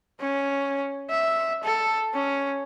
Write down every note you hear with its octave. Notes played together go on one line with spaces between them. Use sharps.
C#4
E5
A4
C#4